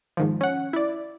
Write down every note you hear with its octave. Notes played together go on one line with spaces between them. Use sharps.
G#2 D#3 F3
C#4 F#5
E4 D5